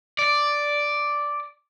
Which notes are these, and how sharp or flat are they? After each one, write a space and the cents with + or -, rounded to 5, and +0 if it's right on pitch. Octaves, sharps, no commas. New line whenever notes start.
D5 +0